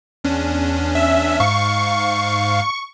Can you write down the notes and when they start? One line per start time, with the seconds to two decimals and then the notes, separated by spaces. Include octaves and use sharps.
0.24 E2 C#4 D4
0.95 E5
1.40 G#2 F5 C#6